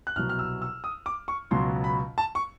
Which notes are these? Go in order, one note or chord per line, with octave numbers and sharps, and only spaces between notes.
F#6
C2 B2 F#3 F6
F6
E6
E6
D#6
D6
C#6
C#2 B2 F#3 C6
B5
A5
C#6